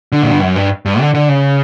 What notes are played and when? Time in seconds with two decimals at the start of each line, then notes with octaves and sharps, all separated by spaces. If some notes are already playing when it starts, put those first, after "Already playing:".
0.12 D3
0.22 A#2
0.32 G2
0.42 F#2
0.56 G2
0.85 G2
1.00 D3
1.15 D3
1.29 C#3